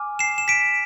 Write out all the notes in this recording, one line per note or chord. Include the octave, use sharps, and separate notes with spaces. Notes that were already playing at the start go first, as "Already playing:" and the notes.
Already playing: G#5 D6 F6
C7 E7
E7
B6 D7